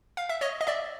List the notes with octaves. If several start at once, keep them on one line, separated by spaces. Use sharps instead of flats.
F5
E5
C#5 D#5
D#5
D5 E5